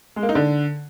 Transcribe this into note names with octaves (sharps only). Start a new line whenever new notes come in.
G#3
A#3
D#4
D3